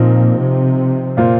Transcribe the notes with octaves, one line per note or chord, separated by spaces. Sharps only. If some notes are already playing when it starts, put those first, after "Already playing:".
Already playing: A#2 F3 C4 D#4
C3
A#2 A#3 F4 C5